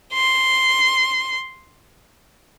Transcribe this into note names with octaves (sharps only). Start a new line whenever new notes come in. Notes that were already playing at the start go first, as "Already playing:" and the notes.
C6